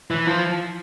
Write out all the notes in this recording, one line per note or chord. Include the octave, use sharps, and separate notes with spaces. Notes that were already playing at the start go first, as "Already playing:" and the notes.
E3
F3